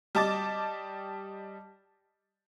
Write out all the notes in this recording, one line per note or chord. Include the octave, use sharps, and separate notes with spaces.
G3 D#5 A5 D6 A6